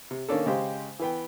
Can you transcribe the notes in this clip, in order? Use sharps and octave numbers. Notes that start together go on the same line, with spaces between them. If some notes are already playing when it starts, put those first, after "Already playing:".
C3
D#3 A#3 C#4 D4 A4
C#3 G#3 G4 C5
E3 B3 G5